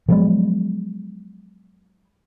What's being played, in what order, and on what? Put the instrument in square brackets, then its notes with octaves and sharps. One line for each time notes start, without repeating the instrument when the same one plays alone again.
[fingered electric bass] F3 F#3 G#3 B3